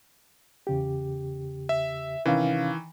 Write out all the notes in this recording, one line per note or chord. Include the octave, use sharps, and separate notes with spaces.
E2 C#3 G4
E5
C3 D#3 E3 C#4 F5